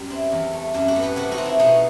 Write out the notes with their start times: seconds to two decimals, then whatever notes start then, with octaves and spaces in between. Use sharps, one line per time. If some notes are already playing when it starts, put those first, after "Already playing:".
Already playing: F#2 G3
0.10 C4 E4
0.32 E2
0.53 A3
0.74 F#2 E4 G4
0.88 F#4 A4
0.96 B3
1.02 G4 B4
1.16 C3 F#4 A4
1.31 D#4 F#4
1.38 C4
1.45 E4
1.59 B2 D#4